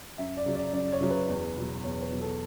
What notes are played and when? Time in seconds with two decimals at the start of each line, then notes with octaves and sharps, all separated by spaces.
0.18 F#2 E5
0.37 D5
0.46 C#3 F#3
0.55 D5
0.73 F#2 D5
0.92 C#5
1.01 C#3 F#3
1.10 B4
1.28 E2
1.56 B2 F#3
1.84 E2 C#5
2.02 B4
2.12 B2 F#3
2.21 A4